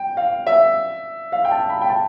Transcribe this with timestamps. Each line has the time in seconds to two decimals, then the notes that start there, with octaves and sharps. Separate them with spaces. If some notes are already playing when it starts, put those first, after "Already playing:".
Already playing: G5
0.17 F5
0.47 E5
1.32 F5
1.45 G5
1.51 A5
1.70 B5
1.81 G5
1.89 A5